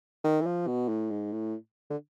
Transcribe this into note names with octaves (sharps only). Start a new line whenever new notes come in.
D#3
E3
F3
B2
A2
G#2
A2
D3